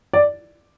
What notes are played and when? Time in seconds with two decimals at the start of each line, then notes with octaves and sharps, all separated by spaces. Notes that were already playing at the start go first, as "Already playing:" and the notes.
0.13 D5